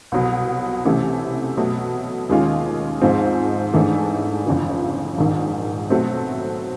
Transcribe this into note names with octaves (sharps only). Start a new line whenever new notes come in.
C2 B2 F#3
C3 E3 A3 C#4
B2 F#3 A3
D#2 D#3 G#3 C#4 F4
G#2 F3 G#3 C4 F4
G#2 E3 A3 D4
G1 F2 C#3 E3
A#1 G#2 D#3
B2 F#3 A3 C4